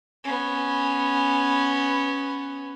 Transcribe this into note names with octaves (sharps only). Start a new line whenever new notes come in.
B3 C#4